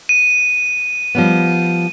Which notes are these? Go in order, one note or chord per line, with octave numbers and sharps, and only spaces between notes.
D#7
F3 G3 B3